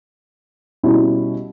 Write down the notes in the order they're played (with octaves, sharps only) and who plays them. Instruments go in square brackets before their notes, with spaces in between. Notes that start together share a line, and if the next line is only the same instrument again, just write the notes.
[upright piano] B2 G3 C#4 E4